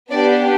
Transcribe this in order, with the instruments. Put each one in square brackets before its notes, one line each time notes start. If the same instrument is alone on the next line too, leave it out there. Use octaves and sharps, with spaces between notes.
[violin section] B3 D4 G4 D5